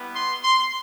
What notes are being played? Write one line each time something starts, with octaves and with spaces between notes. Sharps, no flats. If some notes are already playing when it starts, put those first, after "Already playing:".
Already playing: G3 B3 E4
C6
C6